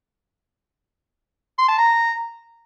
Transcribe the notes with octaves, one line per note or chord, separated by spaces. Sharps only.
C6
A5
A#5